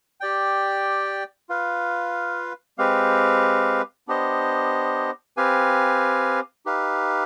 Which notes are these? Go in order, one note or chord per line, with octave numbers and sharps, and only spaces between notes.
G4 D5 G5
F4 B4 F5
G#3 C4 G4 B4 F5
B3 D4 G4 C5 D#5
C4 G4 B4 F5 G#5
D#4 G4 B4 F5